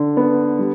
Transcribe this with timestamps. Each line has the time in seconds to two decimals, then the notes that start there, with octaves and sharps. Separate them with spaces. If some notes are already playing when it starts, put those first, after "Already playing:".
Already playing: D3
0.17 B3
0.59 G3